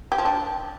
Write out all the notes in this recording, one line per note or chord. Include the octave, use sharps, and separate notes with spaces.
G4
F3
D4